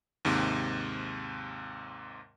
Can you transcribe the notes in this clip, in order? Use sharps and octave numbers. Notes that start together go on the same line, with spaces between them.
D#2 G#2 C3